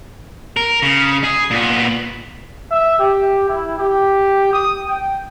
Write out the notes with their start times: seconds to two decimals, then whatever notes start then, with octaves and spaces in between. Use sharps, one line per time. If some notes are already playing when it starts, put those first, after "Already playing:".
0.57 A#4
0.82 C#3
1.24 G#4
1.51 A#2 B3
2.69 E5
2.99 G4
3.48 E4
3.78 G4
4.52 D#6
4.88 G5